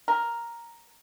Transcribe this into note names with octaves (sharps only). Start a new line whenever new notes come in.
A#4